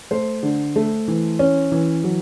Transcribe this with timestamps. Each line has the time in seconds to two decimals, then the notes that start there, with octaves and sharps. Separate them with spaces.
0.11 A3 C5
0.43 D3
0.76 A3
1.08 E3
1.39 C#4
1.72 E3
2.04 F#3